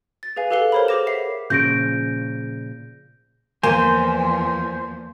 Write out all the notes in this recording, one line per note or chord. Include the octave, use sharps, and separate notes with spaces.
A6
G#4 B4 F5 G#5
G4 A4 B4 F5 F#5 G7
A#4 C5 C#5 A#5 B5
G#4 C5 D6 A#6 E7
E5 F#5 C7
A#2 C#3 F3 G6 A#6 D7
E2 F3 A#3 C5 G#5